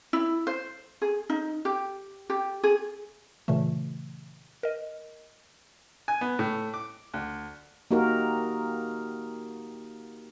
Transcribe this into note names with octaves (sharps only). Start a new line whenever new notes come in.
E4
C5
G#4
D#4
G4
G4
G#4
A#2 C#3 E3 A3
A#4 D#5
G#5
B3
A2
D6
D2
A#3 D#4 F#4 G4 A#4